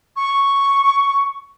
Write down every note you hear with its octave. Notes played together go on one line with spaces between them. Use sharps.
C#6